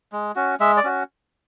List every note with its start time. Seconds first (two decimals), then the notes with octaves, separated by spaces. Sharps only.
0.12 G#3
0.35 C#4 F#4
0.60 G#3 E5
0.77 D5
0.84 C#4 F#4